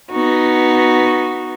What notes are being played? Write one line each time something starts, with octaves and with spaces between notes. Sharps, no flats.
B3 D#4 F#4